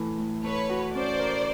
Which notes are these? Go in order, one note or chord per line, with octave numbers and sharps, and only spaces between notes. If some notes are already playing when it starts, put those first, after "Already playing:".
Already playing: A2 E3 A3
A2
A3 B4 C#5
F#4
C#4 C5 D5
A#4